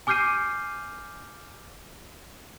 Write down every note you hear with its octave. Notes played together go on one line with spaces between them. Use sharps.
G#5 D6 F6 G6 C7 D#7